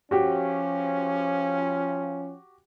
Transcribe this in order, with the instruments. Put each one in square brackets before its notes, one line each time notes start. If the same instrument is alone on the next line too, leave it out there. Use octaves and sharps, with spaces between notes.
[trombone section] F3 C#4 [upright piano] F#4 G4